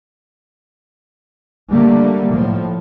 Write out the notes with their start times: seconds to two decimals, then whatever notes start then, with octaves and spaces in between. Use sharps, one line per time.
1.71 D3 G3 A3 A#3
2.34 A2 F3